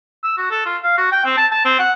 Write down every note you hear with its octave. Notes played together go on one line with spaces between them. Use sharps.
E6
F#4
A4
F4
F5
F#4
G5
C4
A5
A5
C4
F#5